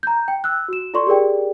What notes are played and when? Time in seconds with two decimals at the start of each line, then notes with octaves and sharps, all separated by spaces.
0.03 A#5 G6
0.28 G5
0.44 E6 F#6
0.68 F#4 E7
0.94 F4 A4 D5 C6 C#6
1.06 G4 G#4 A#4 D5 G5